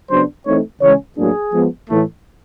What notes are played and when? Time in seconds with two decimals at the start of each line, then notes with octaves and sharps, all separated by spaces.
0.10 C#3 F#3 B3 D4 C5
0.46 E3 A3 C4 D#4 C#5
0.81 C#3 E3 G#3 C#4 C#5
1.17 A2 F#3 A#3 D4 G#4
1.53 F3 G#3 B3
1.90 A2 E3 A3